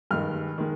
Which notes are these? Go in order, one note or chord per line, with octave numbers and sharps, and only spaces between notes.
G2 D#3 G#3 F6
D#3 G#3